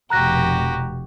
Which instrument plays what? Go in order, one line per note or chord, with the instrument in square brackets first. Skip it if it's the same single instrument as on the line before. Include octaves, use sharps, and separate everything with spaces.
[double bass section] F1 B2 [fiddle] F#4 G4 [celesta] A#5 F#6 A#6